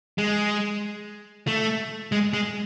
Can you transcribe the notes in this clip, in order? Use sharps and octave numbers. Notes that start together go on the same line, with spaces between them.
G#3
A3
G#3
G#3